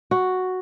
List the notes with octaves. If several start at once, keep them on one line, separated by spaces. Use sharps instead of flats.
F#4